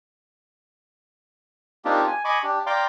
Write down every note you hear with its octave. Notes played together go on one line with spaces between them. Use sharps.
A#3 C4 D4 D#4 F4 G4
G#5
D#5 G#5 B5 C#6 D6
D4 G4
D5 F5 G5 A#5 C6 D6